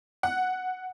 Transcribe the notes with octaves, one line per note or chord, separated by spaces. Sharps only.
F#5